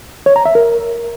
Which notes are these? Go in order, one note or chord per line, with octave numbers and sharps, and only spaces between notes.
C#5
A#5
E5
A#4